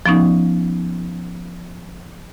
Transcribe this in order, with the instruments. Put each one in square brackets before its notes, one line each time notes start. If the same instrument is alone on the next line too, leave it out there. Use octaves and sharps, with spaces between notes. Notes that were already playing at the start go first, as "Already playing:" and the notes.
[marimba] F3 B3 C#4 D#4